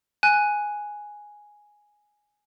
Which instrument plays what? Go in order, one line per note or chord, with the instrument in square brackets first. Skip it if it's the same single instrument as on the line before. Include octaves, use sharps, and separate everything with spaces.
[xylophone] G#5 F#6